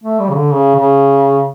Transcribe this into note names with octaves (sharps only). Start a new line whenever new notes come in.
A3
G3
C#3
D3
C#3
C#3